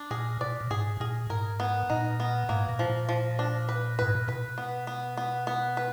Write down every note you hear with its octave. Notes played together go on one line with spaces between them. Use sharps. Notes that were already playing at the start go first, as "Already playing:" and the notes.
Already playing: D4
A#2 G#4
B2 D5
A#2
G#2 G#4
A#2 G#4
G#2 A#4
B3
A#2 D#4
B3
G#2 A#3
A#2
F3
A#2
F3
D4
B4
G#2 B4
A#2
B2 B4
B3
B3
B3
B3
B4